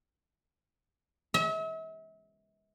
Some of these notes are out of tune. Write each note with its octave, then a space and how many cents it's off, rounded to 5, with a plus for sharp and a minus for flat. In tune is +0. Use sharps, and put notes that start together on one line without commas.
E5 -40